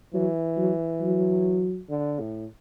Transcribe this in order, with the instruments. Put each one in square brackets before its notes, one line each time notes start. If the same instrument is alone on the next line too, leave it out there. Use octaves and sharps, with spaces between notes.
[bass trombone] E3 [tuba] F#3
[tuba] F#3
F#3
[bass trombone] D3
A2